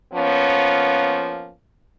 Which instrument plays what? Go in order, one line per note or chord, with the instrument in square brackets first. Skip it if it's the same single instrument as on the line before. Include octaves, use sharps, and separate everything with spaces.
[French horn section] F3 A#3 B3 C#4